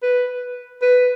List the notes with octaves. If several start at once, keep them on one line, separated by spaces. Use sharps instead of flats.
B4
B4